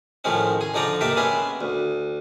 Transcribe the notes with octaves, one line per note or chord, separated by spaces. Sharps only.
A2 D#3 F3 G#3 C4 C#4
G#4
D3 F3 D#4 D5 A#5
A#3 D#4 G4 E5 G5 A5
G#3 B3 C#4 G#4 E5
D2